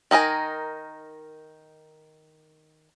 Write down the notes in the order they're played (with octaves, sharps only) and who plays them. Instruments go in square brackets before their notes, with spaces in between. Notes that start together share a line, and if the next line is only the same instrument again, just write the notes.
[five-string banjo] D#3 D#4 A#4 G#5